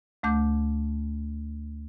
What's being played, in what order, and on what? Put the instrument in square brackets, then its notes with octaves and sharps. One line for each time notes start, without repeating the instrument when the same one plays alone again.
[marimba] D2 A3 D6 G6